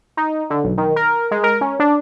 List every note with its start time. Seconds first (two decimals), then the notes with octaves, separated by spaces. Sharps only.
0.17 D#4
0.50 D3
0.64 B1
0.77 D#3
0.96 A#4
1.31 G#3
1.44 A#4
1.61 C#4
1.80 D4